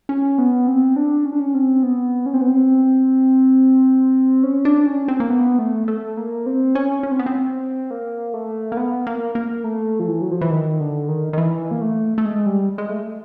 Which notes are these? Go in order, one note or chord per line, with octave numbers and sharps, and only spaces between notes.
C#4
B3
C4
D4
C#4
D4
C#4
C4
B3
C#4
C4
B3
C4
C#4
D4
C#4
C4
A#3
B3
A3
A3
A#3
C4
C#4
C#4
C4
B3
C4
A#3
A3
A#3
B3
A#3
A#3
A3
F3
E3
F#3
F3
E3
D#3
D3
D#3
D#3
E3
A#3
A3
A3
G#3
G3
G#3
A3